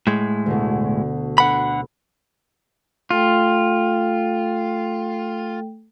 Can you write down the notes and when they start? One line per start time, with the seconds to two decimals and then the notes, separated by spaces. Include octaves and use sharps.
0.07 A2 G#3
0.46 D2 B2
1.38 D3 B4 F#5 B5
3.11 A3 F4 A4 G5